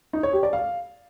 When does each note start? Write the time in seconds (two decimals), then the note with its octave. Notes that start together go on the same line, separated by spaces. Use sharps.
0.13 D#4
0.23 C#5
0.33 G4
0.43 D5
0.53 F5